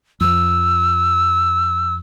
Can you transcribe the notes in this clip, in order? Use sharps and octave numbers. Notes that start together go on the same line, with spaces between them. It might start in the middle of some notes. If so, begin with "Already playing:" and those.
F2 F3 E6